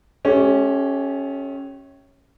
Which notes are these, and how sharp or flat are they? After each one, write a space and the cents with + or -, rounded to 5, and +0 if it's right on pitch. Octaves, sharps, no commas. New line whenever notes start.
A3 -45 C#4 -5 G4 -15